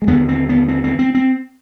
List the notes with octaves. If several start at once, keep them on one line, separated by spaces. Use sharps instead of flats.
G#3
D#2 D3 B3
C4
B3
C4
C4
C4
C4